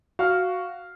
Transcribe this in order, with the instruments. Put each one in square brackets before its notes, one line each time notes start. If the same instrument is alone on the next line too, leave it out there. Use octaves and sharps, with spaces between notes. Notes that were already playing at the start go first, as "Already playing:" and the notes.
[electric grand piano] F#4 [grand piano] F5 F6